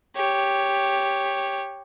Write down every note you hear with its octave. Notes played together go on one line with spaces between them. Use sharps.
G4 C#5